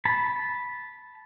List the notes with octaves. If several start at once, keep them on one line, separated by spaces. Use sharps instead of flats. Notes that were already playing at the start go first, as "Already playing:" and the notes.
A5 B5